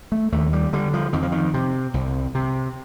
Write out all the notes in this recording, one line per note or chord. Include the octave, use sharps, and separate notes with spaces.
A3
D#2 A3
G3
D3 G3
F3
F2 D#3
F3
D#3
C3
C2
C3